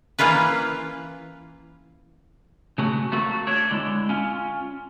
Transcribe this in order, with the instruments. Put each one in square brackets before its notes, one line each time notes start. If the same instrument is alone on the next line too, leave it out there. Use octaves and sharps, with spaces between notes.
[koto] E3 A#3 C#4 F4 B4
[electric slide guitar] C#3 A3 F#4
A3 A#3 F#4 A4
A3 D4 C#5
D3 G#3 E4
C#4 F4